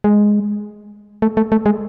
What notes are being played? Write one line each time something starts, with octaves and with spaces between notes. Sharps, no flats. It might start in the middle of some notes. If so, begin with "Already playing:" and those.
G#3
A3
A3
A3
G#3